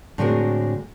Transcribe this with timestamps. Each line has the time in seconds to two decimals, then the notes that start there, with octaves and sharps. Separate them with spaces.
0.18 A2 D3 G#3 C4 F#4 A#4